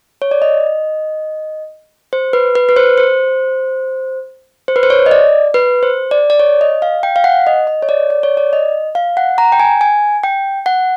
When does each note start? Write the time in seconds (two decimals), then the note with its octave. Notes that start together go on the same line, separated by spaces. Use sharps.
0.22 C#5
0.31 D5
0.42 D#5
2.13 C5
2.33 B4
2.55 B4
2.69 B4
2.76 C5
2.98 C5
4.68 C5
4.76 B4
4.83 C5
4.90 C#5
5.06 D#5
5.11 D5
5.54 B4
5.83 C5
6.11 D5
6.30 D5
6.40 C#5
6.61 D#5
6.82 F5
7.03 G5
7.16 F5
7.24 F#5
7.47 D#5
7.67 D#5
7.82 C#5
7.89 D5
8.10 D5
8.23 C#5
8.37 D5
8.53 D#5
8.95 F5
9.17 F#5
9.38 A#5
9.52 G5
9.60 G#5
9.81 G#5
10.23 G5
10.66 F#5